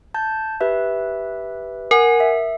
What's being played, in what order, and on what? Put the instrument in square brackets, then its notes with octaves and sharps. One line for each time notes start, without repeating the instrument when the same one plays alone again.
[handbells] A5 G6
G4 B4 E5
[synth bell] A#4 [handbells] F#5 G#5
[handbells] E5